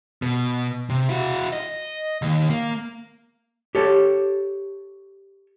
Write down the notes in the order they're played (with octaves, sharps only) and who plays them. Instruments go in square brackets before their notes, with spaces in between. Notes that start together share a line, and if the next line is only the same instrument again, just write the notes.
[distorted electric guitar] B2
C3
E4 F#4
D#5
D#2 D#3
A#3
[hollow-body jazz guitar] G4 A4 C#5